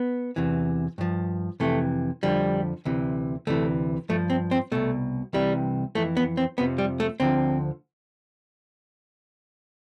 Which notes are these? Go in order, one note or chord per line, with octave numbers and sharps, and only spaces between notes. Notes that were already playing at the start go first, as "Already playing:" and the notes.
Already playing: B3
E2 C3 E3
G2 F3
F2 C3 E3 A3
F2 D3 F3 G3
D2 C3 E3
D2 C3 E3 A3
G2 F3 A3
C4
C4
C2 B2 A3
C2 C3 E3 G3
F2 E3 A3
B3
C4
F2 C3 F3 B3
G3
A3
D2 D3 F3 C4